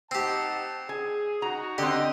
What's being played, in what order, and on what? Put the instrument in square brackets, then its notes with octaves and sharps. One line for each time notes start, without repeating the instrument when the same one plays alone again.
[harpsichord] C4 G4 [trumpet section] D#4 F#5 A5
[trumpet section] G#4 [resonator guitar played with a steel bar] G#5
[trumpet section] D#4 F#4 [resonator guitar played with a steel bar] A#5
[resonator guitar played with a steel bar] D3 C4 [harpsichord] G4 [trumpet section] D#5 G5